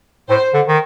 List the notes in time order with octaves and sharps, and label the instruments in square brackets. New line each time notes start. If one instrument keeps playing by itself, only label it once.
[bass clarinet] A2 [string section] C5
[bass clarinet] D3
D#3